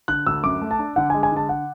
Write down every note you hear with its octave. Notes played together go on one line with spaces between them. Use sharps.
D3 F#6
D2 E6
F#2 D6
A3
A5
D4
D3 F#5
G#3 G#5
G#5
D3 A5
F#5